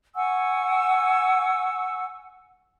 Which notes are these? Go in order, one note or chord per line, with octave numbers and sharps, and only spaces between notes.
F#5 G#5 C#6 E6